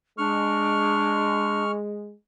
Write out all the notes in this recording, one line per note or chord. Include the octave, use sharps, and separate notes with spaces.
G#3 D4 C#6 F6